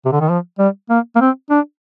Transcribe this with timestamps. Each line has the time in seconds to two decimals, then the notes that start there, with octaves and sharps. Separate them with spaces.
0.05 C3
0.12 D3
0.20 D#3
0.29 F3
0.59 G3
0.90 A#3
1.15 A#3
1.21 C4
1.50 D4